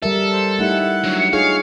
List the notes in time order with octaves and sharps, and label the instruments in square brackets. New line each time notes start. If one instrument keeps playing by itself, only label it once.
[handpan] G3 A#4 E5 [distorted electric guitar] A4
[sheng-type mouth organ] C5
[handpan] A3 D#4 G4 [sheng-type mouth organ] E4 F#5
[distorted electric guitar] F#3 [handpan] D4
[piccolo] C#7
[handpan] D#4 F4 G#4 [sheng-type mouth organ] C#5 C#6 [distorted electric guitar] F5